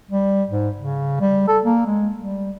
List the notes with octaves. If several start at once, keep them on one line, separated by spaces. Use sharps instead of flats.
G3
G#2
C#3
G3
A4
A#3
G#3
G3